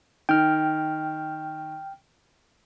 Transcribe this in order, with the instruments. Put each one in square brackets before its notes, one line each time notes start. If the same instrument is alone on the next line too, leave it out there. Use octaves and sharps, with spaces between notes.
[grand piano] D#3 [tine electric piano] G5 F6